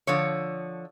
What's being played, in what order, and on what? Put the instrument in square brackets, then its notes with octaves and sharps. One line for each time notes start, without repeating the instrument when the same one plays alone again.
[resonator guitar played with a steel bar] D3 F3 C#5